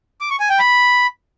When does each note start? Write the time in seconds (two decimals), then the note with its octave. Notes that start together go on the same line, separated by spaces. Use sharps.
0.21 D6
0.30 C#6
0.40 G#5
0.49 G5
0.59 B5